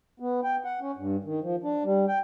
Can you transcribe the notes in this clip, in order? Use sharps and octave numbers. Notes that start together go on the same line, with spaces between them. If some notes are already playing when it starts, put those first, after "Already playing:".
B3
G5
F#5
C#4
G2
D#3
F3
D4
G3
G5